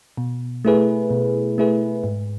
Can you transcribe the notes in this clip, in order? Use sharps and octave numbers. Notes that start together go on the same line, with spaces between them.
B2
A3 E4 G#4 B4
B2
A3 E4 G#4 B4
G#2